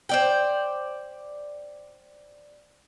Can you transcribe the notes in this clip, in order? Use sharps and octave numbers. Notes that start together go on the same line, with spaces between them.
C5 D5 G5